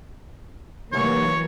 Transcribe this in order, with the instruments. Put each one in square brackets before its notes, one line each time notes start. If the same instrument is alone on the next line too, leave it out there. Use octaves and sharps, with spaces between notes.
[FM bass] F1 [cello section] E3 F#3 A#3 [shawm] C#5